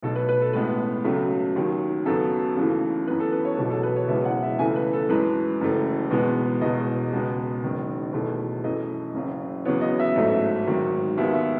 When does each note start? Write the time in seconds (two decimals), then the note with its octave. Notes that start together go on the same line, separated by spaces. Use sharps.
0.03 B1 B2 A3 A4
0.16 B4
0.29 B4
0.42 A4
0.53 A1 A2 G#3 B3 B4
1.04 C#2 C#3 F#3 A3
1.56 D#2 D#3 F#3
2.06 F#2 C#3 F#3 B3 A4
2.56 D#2 C#3 E3 A3
3.07 F#2 E3 B3 B4
3.20 A4
3.32 B4
3.45 C#5
3.57 E1 E2 B2 F#3 B3 B4
3.70 A4
3.83 B4
3.96 C#5
4.08 F#1 E2 B2 G#3 B3 E5
4.25 F#5
4.43 E5
4.59 C#2 C#3 E3 A3 G#5
4.76 B4
4.93 A4
5.09 F#2 E3 G#3 B4
5.61 F#1 F#2 E3 A3
6.10 E2 B2 G#3 B3
6.61 E1 E2 B2 D#5
7.12 C#2 B2 G#3 B3
7.63 F#1 F#2 D#3
8.13 E2 B2 A3
8.64 F#2 E3 A3 D#5
9.14 F#1 F#2 C#3
9.65 E2 C#3 F#3 B3 C#5
9.81 D#5
9.99 E5
10.16 A1 G#2 F#3 A3
10.67 G#1 G#2 D#3 F#3
11.17 D#2 D#3 G#3 B3 E5
11.34 E5